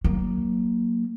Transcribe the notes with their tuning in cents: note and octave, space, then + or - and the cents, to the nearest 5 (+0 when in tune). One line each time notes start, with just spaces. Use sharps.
F#3 +0 A#3 +0